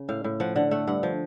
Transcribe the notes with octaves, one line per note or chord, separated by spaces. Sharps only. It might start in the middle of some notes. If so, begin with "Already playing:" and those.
Already playing: C#3
A2 F5
A2
F3 F#5
D3 F#5
A3 F#5
G2 F#5
F3